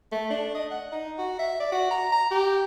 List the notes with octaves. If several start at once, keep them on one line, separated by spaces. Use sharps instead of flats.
A3
D4
D#5
F#5
D#4
F#4
E5
D5
F#4
A#5
A#5
G4